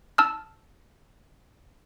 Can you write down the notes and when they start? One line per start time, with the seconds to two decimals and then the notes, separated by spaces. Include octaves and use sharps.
0.18 A5 E6 F6